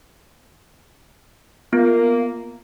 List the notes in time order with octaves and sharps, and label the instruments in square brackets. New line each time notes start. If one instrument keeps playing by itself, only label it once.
[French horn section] A#3 [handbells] B3 F4